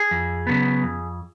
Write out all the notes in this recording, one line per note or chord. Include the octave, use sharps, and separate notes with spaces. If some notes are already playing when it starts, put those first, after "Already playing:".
Already playing: G#4
F2
C#3 F#3 B3
F2